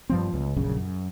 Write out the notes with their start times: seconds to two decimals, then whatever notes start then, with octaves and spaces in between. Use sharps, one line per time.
0.10 G2 F3 C4
0.33 C#2
0.56 A#1 F#2 C#3
0.77 F#2